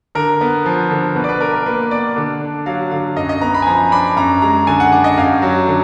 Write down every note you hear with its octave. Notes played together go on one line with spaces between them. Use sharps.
D3 A#4
B3
F3
D3
B2 B4
D5
B4
D4 A#4
A#4
A#3 B4
B2 D5
D3
D4
F#3 F5
D3 F5
F#2 D#5
D#5
B3 A#5
B5
G#5
F3 A#5
D4 B5
F#2 A#5
G#3 A#5
D3 G#5
F#5
D4 F#5
D#5
F#2 F5
F#3
D3